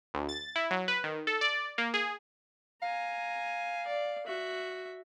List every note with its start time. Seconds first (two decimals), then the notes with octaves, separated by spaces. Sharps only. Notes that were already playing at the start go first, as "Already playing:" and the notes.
0.14 D2
0.29 A6
0.56 E4
0.71 F#3
0.88 B4
1.04 D#3
1.27 A4
1.41 D5
1.78 A#3
1.94 G#4
2.82 F5 G#5 A#5
3.87 D5
4.26 F#4 E5